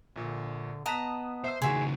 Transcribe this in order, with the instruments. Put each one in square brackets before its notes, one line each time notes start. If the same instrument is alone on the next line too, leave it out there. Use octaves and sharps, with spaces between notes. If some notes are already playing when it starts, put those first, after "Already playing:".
[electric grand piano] A#1 A#2 [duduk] D3
[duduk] B3 [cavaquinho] D#5 A5 A#5 [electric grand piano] D#6 F#6 B6
[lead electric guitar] C5 [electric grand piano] E5 E6
[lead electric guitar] C#2 D#3 [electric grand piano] F#4 F#5 C6 [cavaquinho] G#4 E5